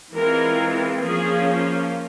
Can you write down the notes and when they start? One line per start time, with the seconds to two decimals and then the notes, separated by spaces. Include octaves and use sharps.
0.14 E3 G#3 C4 F4 A#4
1.02 F3 A#3 C#4 F4 G#4